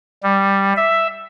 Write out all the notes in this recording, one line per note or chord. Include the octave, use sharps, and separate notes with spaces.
G3
E5